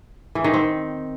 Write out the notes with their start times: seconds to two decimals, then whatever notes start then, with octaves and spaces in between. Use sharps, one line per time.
0.35 E3
0.44 D#3
0.53 C4